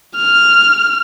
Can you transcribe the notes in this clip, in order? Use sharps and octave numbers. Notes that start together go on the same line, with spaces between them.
F6